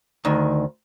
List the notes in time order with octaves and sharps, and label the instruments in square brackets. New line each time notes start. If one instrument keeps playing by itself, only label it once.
[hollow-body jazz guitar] D2 D#3